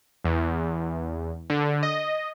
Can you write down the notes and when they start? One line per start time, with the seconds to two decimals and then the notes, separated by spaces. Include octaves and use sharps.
0.24 E2
1.50 D3
1.83 D#5